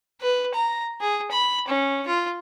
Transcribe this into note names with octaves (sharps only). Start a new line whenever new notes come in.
B4
A#5
G#4
B5
C#4
F4